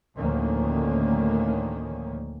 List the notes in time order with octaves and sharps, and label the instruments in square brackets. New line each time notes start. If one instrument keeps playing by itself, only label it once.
[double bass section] D2 A2 D#3 F3 A#3 C#4